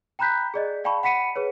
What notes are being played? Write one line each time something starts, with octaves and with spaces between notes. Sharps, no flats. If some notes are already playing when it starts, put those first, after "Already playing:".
G5 A#5 B5 F#6 G6 B6
G#4 D5 D#5
D5 F5 G5 A5 B5 C#6
F#5 B5 B6 C#7 D#7
G#4 B4 C#5